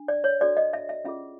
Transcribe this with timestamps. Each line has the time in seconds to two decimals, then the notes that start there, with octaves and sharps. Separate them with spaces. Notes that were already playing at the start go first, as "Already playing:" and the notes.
Already playing: D4
0.08 D5
0.24 C#5
0.40 D4 F#4 A4 C#5 D5
0.57 D#5
0.73 E5
0.89 E5
1.05 C#4 F4 G#4 E5